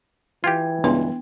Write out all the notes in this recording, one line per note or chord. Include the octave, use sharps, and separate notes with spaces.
E3 F4 G4 G5 G#6
C#2 G2 B3 D4 C6